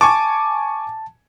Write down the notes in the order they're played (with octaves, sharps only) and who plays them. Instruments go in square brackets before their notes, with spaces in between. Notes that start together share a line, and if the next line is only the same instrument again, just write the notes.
[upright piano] G#5 C#6 D6 [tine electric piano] A5